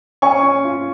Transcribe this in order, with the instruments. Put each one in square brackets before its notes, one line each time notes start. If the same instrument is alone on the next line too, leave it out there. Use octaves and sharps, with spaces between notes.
[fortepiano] C#4 [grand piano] G#5 C#6
[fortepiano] C#4
F4